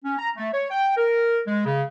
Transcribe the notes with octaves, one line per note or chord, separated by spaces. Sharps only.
C#4
A#5
A3
C#5
G5
A#4
G#3
C#3